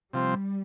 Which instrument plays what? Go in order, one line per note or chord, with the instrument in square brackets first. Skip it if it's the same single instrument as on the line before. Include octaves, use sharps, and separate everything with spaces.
[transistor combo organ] C3 F3 C4 [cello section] G3